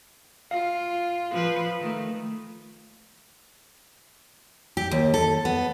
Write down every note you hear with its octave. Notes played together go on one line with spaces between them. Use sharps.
F4 F5
F3 B4
D#3 A3
G4
D#2
A4
B3